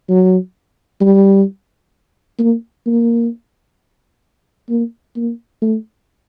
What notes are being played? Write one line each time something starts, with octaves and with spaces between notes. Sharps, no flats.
F#3
G3
A#3
A#3
A#3
A#3
A3